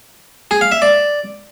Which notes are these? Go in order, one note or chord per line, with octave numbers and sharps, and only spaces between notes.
G#4
F5
E5
D5